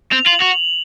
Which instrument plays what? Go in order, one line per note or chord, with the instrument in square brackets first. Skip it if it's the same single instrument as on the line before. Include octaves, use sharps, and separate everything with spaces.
[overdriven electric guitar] C4 [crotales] F7
[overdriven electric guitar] F4 [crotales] F#7
[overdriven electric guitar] F#4 [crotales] F7